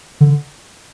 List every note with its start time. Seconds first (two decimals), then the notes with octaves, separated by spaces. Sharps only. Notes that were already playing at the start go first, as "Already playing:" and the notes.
0.21 D3